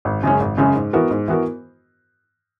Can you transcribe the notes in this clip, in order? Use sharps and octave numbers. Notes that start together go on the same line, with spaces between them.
G#1
F#2 C#3 G#3 C#4
G#1
F#2 C#3 G#3 C#4
G#2
E3 B3 F#4 A#4
G#2
E3 B3 F#4 A#4